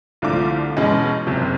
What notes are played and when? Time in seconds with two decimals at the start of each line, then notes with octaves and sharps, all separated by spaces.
0.22 C2 D3 F3 A3 F4 D6
0.77 E2 B2 G#3 C#4
1.27 F#1 C3